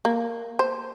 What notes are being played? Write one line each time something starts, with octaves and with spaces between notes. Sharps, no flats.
A#3
C5